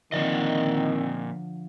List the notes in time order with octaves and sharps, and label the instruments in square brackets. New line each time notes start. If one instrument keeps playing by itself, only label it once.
[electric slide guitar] A#2 D5 D#5 [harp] D3 F3 [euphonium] D#3 [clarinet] C4